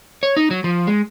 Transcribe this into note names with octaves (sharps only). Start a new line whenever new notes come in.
C#5
D#4
F#3
F3
G#3